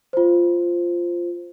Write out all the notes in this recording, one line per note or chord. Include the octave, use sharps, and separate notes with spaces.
F4 C5